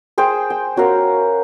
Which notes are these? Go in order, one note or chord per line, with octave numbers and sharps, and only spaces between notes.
G#4 C5 G5
G5
C#4 F#4 A#4 F5